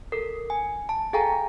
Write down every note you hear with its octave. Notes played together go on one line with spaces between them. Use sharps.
A4 A#4
G#5
A5
G#4 A4 F5 G5 G#5 A#5